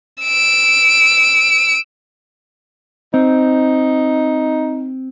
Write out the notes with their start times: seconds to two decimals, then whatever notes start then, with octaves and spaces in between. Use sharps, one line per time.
0.23 E6 D7
3.14 C4 D#4